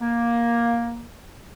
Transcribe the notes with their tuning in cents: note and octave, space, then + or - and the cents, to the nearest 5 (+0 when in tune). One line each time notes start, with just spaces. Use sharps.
A#3 +10